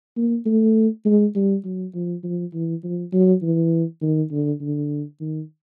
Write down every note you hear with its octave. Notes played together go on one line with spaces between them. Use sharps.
A#3
A3
G#3
G3
F#3
F3
F3
E3
F3
F#3
E3
D#3
D3
D3
D#3